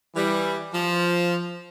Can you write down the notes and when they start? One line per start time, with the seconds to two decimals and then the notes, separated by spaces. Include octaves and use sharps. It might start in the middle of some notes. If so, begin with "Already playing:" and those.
0.15 E3 G3
0.73 F3